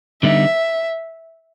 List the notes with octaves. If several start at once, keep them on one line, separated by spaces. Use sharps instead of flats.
D3 G3 B3 D#4 E5